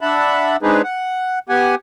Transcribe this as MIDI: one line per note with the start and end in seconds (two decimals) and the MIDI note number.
0.01 0.57 62
0.01 0.57 76
0.01 0.57 78
0.01 0.57 81
0.01 0.57 83
0.62 0.82 56
0.62 0.82 60
0.62 0.82 62
0.62 0.82 63
0.62 0.82 68
0.62 0.82 71
0.84 1.39 78
1.49 1.75 59
1.49 1.75 67
1.49 1.75 78
1.49 1.75 80